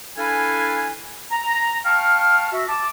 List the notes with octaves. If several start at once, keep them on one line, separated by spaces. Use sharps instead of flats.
D4 E4 A4 B4 F5 G#5
A#5
F5 G5 A5 C#6 F6
F#4 E5
A5 D6